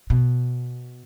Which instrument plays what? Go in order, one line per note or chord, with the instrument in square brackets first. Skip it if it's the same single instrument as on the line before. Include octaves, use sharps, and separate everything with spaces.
[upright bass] B2